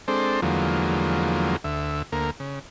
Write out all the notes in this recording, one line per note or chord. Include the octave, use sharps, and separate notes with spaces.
G#3 C4 D4 A4 C5
E2 D3 F3 F#3 G#3 A#3
D2 E5
D2 A#3 A#4
C#3